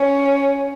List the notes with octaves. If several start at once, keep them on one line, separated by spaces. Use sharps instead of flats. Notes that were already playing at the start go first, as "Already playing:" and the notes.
Already playing: C#4